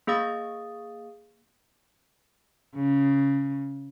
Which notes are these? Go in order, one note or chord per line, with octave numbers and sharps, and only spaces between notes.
A#3 G#4 F5 D#6 A6
C#3